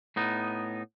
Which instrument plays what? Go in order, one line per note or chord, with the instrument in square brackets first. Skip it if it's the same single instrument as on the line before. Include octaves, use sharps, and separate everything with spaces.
[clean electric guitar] A2 B3 D#4